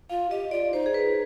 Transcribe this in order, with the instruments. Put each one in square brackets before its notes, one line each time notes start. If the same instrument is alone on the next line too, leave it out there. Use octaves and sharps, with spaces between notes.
[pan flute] F4 [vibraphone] F5
[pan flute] G4 [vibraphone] D#5
[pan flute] F4 [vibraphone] D5
[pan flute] D#4 [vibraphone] C5
[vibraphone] G#4
B4